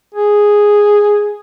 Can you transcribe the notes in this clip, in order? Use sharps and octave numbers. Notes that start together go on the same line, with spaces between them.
G#4